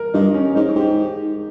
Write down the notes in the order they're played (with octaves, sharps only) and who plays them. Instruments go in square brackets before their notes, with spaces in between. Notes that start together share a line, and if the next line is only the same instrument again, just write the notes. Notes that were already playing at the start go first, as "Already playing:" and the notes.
Already playing: [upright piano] A#4
[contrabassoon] G2 [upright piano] D#4
[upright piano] C#4
[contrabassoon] G#2 [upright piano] D#4
[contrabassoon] G#2 [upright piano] G4